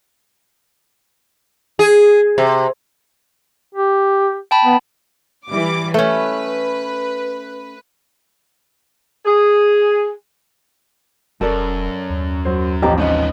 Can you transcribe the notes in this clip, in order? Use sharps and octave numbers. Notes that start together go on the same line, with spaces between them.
G#4
C3
G4
G5 A5 B5
B3
E3 G3 D6
A3 C#4 B4
G#4
E1 F#2 A4 A#4 D5
D#2
F#3 C5
A1 F3 C4 G4 D#5 A#5
G#2 B3 C#4 D#4 D#5